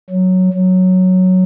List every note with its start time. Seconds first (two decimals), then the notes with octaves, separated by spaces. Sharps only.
0.10 F#3
0.53 F#3